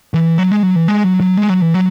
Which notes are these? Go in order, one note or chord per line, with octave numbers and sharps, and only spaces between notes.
E3
F#3
G#3
F#3
E3
G#3
F#3
F#3
G#3
F#3
E3
F#3